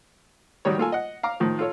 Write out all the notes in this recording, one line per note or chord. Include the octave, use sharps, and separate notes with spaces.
D#3 F#3 G3 C#5
A#3 F4 A4 G#5
D#5 F#5
F5 A#5 D6
A2 D#3 F3
F4 A4 C#5